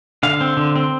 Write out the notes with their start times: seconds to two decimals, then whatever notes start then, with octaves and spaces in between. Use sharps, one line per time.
0.23 D3 F5
0.41 C4
0.57 D3
0.76 C4